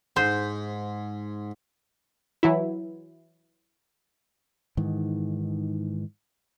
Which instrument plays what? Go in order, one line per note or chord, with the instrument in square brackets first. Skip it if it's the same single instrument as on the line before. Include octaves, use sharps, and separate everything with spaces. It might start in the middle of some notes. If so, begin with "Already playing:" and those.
[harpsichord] G#2 [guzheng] C5
[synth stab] E3 F#3 E4
[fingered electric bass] G#2 D#3 E3